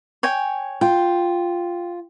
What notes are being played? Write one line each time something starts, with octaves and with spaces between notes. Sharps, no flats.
C#5 G5 G#5
F4 G5